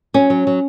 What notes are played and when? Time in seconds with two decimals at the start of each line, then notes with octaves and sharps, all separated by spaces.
0.14 F#3 C#4
0.30 F#3
0.47 F#3